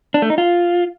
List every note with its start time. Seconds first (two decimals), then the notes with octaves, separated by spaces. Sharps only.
0.14 D4
0.22 A3
0.30 D#4
0.38 F4